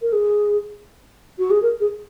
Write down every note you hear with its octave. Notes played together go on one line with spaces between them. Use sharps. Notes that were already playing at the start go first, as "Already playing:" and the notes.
A#4
G#4
F#4
G#4
A#4
G#4